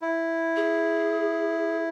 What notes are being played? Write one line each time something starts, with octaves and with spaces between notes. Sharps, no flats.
E4
G#4